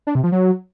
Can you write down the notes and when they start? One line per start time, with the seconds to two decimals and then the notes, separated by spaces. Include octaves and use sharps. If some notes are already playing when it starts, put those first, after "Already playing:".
0.07 D4
0.15 C3
0.24 F3
0.32 F#3